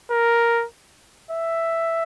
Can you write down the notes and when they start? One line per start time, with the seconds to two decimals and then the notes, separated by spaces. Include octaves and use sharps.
0.11 A#4
1.31 E5